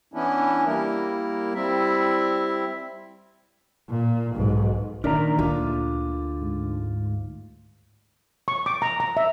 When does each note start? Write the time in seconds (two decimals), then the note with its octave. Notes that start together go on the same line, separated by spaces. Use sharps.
0.14 E3 B3 C#4 D4 E4
0.66 G3 A#3 E4 A#4
1.55 G3 C4 E4 E5
3.89 A#2
4.35 B1 G#2
5.04 A#2 D#3 E3 D4 A#4 D5 E5 A#5
5.39 D2 D3 F4
6.41 G#2
8.48 C#6
8.66 D6
8.82 A#5
9.00 A#5
9.17 E5